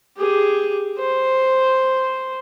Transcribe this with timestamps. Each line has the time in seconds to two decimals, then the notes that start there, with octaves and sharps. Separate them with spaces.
0.18 G4 G#4
0.99 C5